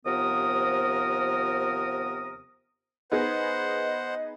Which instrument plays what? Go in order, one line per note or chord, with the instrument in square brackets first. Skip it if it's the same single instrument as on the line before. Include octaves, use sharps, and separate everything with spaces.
[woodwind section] D#2 C3 F3 B3 A#4 D#6
[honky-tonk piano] B3 D#4 G#4 [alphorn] B4 [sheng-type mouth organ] C5 F#5 [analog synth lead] D#5